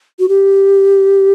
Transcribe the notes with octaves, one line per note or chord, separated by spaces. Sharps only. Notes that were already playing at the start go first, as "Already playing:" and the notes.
F#4
G4